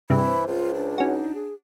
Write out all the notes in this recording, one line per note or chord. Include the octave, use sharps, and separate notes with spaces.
G2 C3 E3 G#4 B5
C5
C#2 F4
D4
C#4 D#4 F#4
G#4